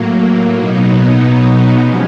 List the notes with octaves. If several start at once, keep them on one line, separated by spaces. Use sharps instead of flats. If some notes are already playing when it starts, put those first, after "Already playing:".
Already playing: A2 F#3 A#3
B2 F#3 B3 D#4
C3 F3 G#3 C#4